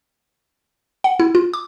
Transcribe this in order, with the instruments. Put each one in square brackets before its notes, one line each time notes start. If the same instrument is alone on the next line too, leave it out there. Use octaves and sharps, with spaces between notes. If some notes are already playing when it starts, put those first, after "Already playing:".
[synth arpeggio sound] F#5
E4
F4
D6